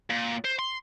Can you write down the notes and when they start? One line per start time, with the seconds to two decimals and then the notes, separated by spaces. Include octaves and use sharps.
0.10 A#2
0.44 C5
0.59 C6